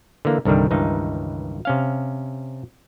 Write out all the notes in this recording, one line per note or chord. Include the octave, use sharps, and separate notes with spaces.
D3 E3 A#3
C2 G2 D3 D#3 G3
C#2 G2 D#3 E3 D#4
C3 C#4 F5